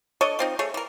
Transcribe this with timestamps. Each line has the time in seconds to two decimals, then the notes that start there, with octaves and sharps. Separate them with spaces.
0.21 D4 A4 C#5 D#5
0.39 F3 C4 D#4
0.59 A3 G#4 C#5
0.74 E3 A#4